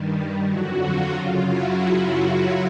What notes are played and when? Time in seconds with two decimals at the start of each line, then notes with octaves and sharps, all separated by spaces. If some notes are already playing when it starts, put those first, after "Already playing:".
Already playing: G2 D#3 G3
0.46 F2 D3 F#3 E4 F#4
0.79 F4
1.13 F#2 C#3 F#3 F4
1.46 E4 F#4